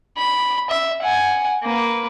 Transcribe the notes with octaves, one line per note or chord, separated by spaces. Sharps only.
B5
E5
F#5 G#5
A#3 B4